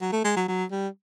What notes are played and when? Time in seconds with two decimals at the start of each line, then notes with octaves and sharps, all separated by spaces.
0.01 F#3
0.13 A3
0.25 G#3
0.37 F#3
0.48 F#3
0.71 G3